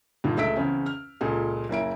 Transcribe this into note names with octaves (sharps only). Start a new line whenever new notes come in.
G2 A#2 D3 D#3
C#2 A3 E5 E6 B6 D7
E2 C#3 C4 C#4
F6
C#2 A#2 G#4 A4
F#1 A#3 E4 D7